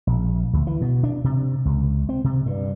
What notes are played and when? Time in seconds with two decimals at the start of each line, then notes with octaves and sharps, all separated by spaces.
0.07 A#1
0.53 D2
0.67 E3
0.82 B2
1.03 D4
1.24 C3
1.65 C#2
2.09 C4
2.24 C3
2.46 G2